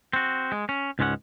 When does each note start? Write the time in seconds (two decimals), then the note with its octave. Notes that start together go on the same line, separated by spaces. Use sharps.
0.13 C4 F#4
0.52 G#3
0.69 C#4
0.99 C#2 G#2 G#3 C#4 F#5